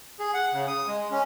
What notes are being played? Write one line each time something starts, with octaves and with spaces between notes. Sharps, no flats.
G#4
F#5
C#3
D#6
G#3
C#4